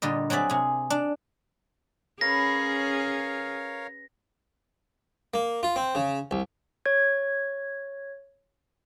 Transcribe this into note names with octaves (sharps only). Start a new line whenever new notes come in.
A#2 D3 G3 D#5
F#3 C4 G#4 D5 E5
C3 G#4
D4
C#4 G#4 A#4 B4 C#5 F5 A#6
A#3
F4
C4
C#3
C2
C#5 G#6